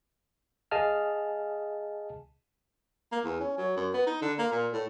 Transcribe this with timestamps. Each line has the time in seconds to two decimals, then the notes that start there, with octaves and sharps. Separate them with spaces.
0.71 G#4 D#5 F5 G#5 A5 F6
3.12 A#3
3.24 E2
3.40 C#4
3.58 F#3
3.77 F#2
3.93 B3
4.07 D#4
4.22 D3
4.39 A#3
4.52 A#2
4.72 A2